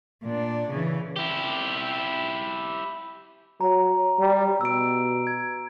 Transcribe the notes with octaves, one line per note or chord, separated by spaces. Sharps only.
A#2 D4
C#3 E3
E4 G4
F#3 A#5
G3
B2 E6 D7
G#6